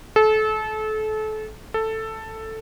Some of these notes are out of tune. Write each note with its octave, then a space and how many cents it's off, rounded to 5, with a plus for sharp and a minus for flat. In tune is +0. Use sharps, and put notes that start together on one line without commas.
A4 -30
A4 +5